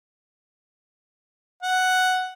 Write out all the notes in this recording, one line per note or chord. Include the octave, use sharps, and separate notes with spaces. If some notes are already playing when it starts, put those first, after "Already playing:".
F#5